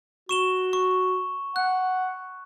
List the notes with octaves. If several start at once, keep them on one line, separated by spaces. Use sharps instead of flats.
F#4 C#6 E7 G7
C#6
F#5 F#6